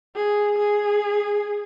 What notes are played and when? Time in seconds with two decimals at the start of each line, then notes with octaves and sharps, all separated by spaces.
0.15 G#4
0.58 G#4